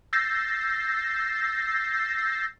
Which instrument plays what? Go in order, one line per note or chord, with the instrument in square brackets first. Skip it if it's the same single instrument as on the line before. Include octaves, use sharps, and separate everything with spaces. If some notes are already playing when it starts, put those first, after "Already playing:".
[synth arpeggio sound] E6 G6 A6 A#6 C7